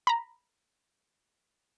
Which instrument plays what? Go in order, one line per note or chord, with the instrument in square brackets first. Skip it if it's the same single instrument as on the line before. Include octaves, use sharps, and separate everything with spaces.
[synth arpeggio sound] A#5 B5